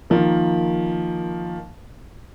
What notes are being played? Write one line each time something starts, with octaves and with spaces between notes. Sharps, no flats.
D#3 F3 A#3